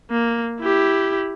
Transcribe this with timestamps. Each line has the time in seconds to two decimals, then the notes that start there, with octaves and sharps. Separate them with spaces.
0.11 A#3
0.60 E4 G4